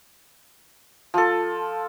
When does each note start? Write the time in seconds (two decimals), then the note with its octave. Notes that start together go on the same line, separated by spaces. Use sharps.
1.14 F3 A4